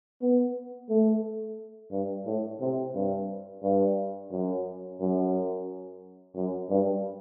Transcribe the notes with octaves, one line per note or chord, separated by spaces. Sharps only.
B3
A3
G2
A2
C3
G2
G2
F#2
F#2
F#2
G2